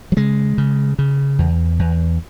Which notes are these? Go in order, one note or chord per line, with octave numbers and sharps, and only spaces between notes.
F#3
C#3 G#3
C#3
C#3
E2
E2